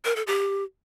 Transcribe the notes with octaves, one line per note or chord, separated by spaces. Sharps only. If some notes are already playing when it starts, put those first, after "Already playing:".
A#4
A4
G4